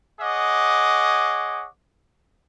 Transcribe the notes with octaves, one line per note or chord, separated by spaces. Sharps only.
G#4 C#5 D#5 F#5 D6